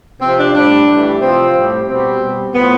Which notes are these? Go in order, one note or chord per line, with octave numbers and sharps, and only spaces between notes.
C3 F3 C4
D4
A2 G3 D4
A2 E3 G3
C3 F3 C4
A2 G3
B2 G3 C4
B2 G3
A2 F3 B3